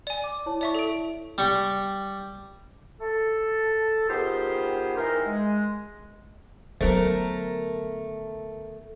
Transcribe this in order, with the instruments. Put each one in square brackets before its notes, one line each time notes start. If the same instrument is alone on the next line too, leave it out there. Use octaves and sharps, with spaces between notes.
[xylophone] D5 G#5
[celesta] D6
E4 C#5 A5
[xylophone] D5 E5 C#6
A4 D7
[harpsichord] G3 C#6
[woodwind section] A4
D#3 B3 F4 G4 G#4 C5
D#3 E3 D#4 A#4
G#3
[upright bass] D3 B3 [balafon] F#3 A4 C5 [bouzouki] A3 A#4